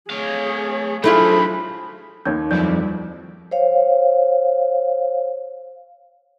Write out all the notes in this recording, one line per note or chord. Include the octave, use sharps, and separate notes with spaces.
A3 G#4 C#5 F5
F#3 A3 D4 E4 F4 G#4 C5 B5
D#2 A#3 C#5 G6
F2 F#3 G3 E4 D5 G6
C5 C#5 F5